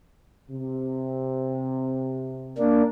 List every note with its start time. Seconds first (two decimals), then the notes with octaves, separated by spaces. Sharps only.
0.51 C3
2.58 A#3 D4